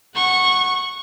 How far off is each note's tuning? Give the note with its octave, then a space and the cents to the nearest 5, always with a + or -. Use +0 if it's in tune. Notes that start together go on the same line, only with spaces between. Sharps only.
F#5 +0 C#6 -15